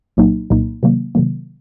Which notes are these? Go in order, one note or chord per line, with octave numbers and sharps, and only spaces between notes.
C2 A#2 F#3 A#3 D#4
C2 A#2 F#3 A#3 D#4
C3 D#3 F#3 A#3
C3 D#3 F#3 A#3